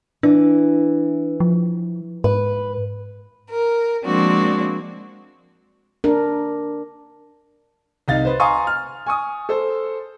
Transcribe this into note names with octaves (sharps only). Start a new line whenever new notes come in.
E3 D4
F3
G#2 B4
A#4
F3 G#3 A#3 C4 D4 F#4
D4 A#4
C2 D#4 F5 A6
B4 C5
F5 G#5 A#5 C6 C#6 D#6
F6
G#5 C#6 D#6
A4 C5